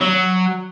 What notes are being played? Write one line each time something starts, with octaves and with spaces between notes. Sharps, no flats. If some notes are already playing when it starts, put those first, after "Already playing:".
F#3